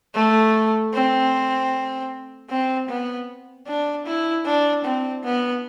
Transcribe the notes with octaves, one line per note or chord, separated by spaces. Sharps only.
A3
C4
C4
B3
D4
E4
D4
C4
B3